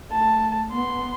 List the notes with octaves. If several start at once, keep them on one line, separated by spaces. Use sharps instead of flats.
A3 A5
B3 C6